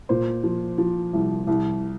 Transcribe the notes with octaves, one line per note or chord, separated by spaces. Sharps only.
A#2 C5
F3
F3
C2
C2